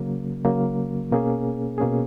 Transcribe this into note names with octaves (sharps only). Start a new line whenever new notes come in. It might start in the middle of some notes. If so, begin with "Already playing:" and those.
Already playing: C#3 F#3 A#3
C#3 F#3 A#3
B2 A#3 C#4 G#4
B2 A#3 C#4 G#4